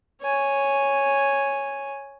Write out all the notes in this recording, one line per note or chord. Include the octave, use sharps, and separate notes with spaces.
C#5 G#5